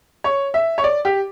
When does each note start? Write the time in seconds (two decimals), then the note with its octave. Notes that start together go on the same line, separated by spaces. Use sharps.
0.24 C#5
0.54 E5
0.78 C#5
0.84 D5
1.05 G4